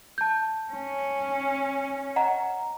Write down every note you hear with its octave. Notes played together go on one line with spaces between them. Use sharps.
A5 G6
C#4
D#5 F#5 A#5